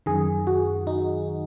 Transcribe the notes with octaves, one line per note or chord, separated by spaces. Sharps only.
F#2 D#3 G#4
F#4
D#4